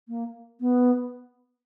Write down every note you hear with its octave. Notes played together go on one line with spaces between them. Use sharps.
A#3
B3